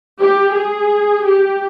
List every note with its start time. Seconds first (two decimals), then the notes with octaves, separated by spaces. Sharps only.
0.20 G4
0.54 G#4
1.25 G4